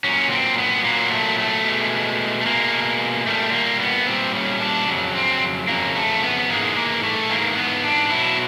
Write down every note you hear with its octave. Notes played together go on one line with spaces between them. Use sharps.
A#2 F#3 C#4
C4
B3
A#2 F#3 A#3
A3
A3
B2 G#3
A3
B2 G#3 A#3
A#2 G3 A3
A#3
B3
A#2 G3 C4
C#4
D4
F2 C#3 F#3
C4
F2 C#3 F#3 A#3
A3
B3
G#2 E3 G#3 A#3
A#3
A3
G#2 E3 G#3 A#3
B3
D4
B2 F#3 E4